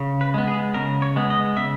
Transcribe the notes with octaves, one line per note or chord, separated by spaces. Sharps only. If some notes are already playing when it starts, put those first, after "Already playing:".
Already playing: C#3
B4
G#3 B3
G#4
C#3 A#4
C#5
G#3 B3
D#5
C#3 E5